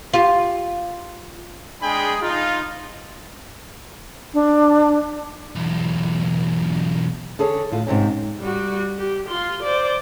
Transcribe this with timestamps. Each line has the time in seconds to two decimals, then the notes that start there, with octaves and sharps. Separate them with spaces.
0.14 F4 G4
1.82 G#3 D4 G#4 G5 B5
2.22 D#4 F4
4.34 D4
5.55 B1 E2
7.39 D3 G#4 A4 C#5
7.71 A2 F4
7.87 G#2 C3 C4 C#4
8.39 G3 F#4
8.98 G4
9.28 F4 C6
9.62 C5 D5